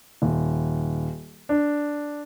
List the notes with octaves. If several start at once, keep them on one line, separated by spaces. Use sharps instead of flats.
D#1
D4